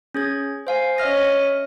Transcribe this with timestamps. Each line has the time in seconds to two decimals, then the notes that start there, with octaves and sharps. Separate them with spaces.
0.15 C#4 G#4 G#6
0.67 C5 F5 G#5
0.98 C#4 D#5 E5 F6 A#6